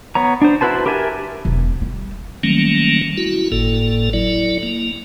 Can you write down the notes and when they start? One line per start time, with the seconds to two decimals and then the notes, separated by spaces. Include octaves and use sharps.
0.15 B3 C#5 A#5
0.42 D4 C5
0.61 E4 F#4 B4 C5 A5
0.86 G4 A#4 E5 G#5 A5
1.45 E1
1.81 G3
2.43 D#3 F#3 G3 A3 A#3 C#4
3.18 E4 F#4
3.52 G1 A2 A#3 A4
4.13 F#3 E4 D5
4.63 A#3